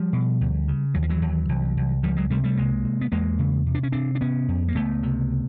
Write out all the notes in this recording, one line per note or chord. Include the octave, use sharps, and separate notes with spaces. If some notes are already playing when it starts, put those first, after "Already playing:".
Already playing: F3 G3
B2
D2
C#3
D#2 F#3
F3
E3 F#3
D#2
C2
C2
C#2 F3 G3
F#3 G#3
C3 G3 A3
G3 A3
C2 G#3 A#3
C3
B3
E2 G#3 A#3
C#3
C3
D4
C#4
C3 C4 D4
D4
C3 B3 C#4
F2
A#3
C#2 A3 B3
C3